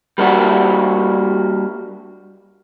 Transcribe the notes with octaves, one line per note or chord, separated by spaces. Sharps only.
G3 A#3 D4 F#4